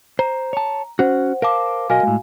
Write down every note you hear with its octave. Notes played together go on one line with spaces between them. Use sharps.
C5 A#5
C#5 A5
C#4 F#4 C5 F#5
A#4 C5 F5 A5 D6
B1 F#4 A#4 D#5 F5 G#5
A2 G#3